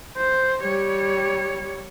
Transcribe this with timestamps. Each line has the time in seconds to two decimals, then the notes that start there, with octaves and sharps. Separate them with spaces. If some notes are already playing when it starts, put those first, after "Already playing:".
0.17 C5
0.62 G3 C#5